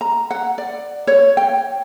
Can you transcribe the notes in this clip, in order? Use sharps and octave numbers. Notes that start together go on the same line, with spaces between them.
A#5
F#5
D5
C#5
G5